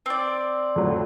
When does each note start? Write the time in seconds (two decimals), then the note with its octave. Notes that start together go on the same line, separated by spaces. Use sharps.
0.06 C4 D5
0.76 F2 A2 F#3